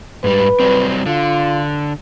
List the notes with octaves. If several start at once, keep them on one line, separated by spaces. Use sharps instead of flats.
G#2 G3 B4
F#3 G3 C4
D3 F4